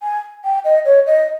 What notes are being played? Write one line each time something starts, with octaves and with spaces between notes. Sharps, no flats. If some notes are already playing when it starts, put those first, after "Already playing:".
G#5
G5
D#5
C#5
D#5